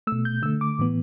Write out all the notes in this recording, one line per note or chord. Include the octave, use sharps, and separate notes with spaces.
A3 E6
B2
G6
D3 A3 E6
D6
A2 E3 B3